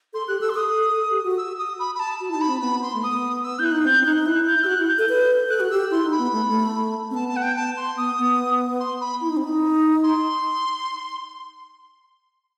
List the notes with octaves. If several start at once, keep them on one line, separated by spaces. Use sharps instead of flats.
A4 C6
G4 F#6
A4 E6
C6
A4 D#6
A4
A4
G4
F#4
E6
D#6
B5
B5
A5
F#4
D#4 E4 A5
B5
C4
B3 B5
C6
A3
B3 D#6
E6
E4 G6
F#6
D#4
C4 G6
C4
D#4 F#6
D#4
E4 F#6
G6
G4 E6
F#4 F#6
E4
G6
A4
B4
A4 F#6
F#4
G4 E6
E4 C6
D#4
B5
B3
A3
A3
C4
B3 A5
A5
F#5
G5
A5
C6
B3 D#6
B3
C6
B5
E4
D#4
C4
D#4
C6